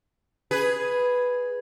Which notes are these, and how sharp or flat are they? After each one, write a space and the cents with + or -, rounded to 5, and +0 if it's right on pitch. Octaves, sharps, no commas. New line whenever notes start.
G#4 +0 B4 +0